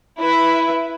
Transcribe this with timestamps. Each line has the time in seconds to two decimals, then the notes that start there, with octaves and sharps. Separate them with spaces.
0.19 E4 B4